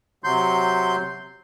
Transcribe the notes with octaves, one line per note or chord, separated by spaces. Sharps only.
C3 F#3 C6 G6